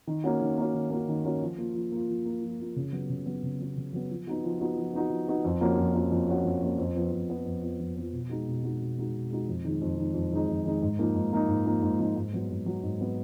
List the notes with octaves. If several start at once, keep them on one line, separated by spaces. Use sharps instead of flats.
D#3
A#3 C#4 F#4
D#3
A#3 C#4 F#4
D#3
A#3 C#4 F#4
D#3
A#3 C#4 F#4
F3
A#3 F4
F3
A#3 F4
F3
A#3 F4
F3
A#3 F4
C#3
F#3 B3
C#3
F#3 B3
C#3
F#3 B3
C#3
F#3 B3
F3
B3 D#4 F#4
F3
B3 D#4 F#4
F3
B3 D#4 F#4
F3
B3 D#4 F#4
F2
F3 A#3 C#4 F#4
F2
F3 A#3 C#4 F#4
F2
F3 A#3 C#4 F#4
F2
F3 A#3 C#4 F#4
F2
F3 B3
F2
F3 B3
F2
F3 B3
F2
F3 B3
B2
G#3 D#4 F#4
B2
G#3 D#4 F#4
B2
G#3 D#4 F#4
B2
G#3 D#4 F#4
F2
D#3 G#3 D#4
F2
D#3 G#3 D#4
F2
D#3 G#3 D#4
F2
D#3 G#3 D#4
G#2
F3 A#3 D#4
G#2
F3 A#3 D#4
G#2
F3 A#3 D#4
G#2
F3 A#3 D#4
G#2
F#3 B3
G#2
F#3 B3
G#2
F#3 B3